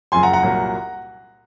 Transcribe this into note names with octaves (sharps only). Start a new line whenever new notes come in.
F#1 F#2 F3 G#5 C6
F#5 A#5
F#5 A#5
C2 A#2 F#3